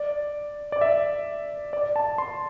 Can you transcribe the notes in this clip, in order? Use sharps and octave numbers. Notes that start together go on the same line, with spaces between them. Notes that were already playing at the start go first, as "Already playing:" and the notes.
Already playing: D5
D5
E5
D5
A5
C6